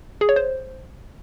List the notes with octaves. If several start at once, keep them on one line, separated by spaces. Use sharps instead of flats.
G#4
C#5
C5